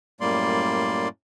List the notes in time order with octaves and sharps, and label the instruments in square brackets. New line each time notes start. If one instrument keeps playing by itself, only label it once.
[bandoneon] F#2 A2 G3 A#3 D5 C6